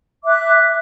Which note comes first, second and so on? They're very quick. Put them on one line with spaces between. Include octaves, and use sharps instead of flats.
D6 E5 F#6